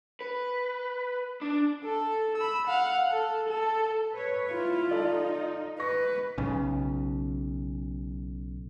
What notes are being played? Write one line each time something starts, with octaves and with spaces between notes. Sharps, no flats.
B4
D4
A4
B5 E6
F5 F#5
A4
A4
B4 C#5
E4 F4
D#4 A4 D5
B4 C#6 A#6
B1 C#3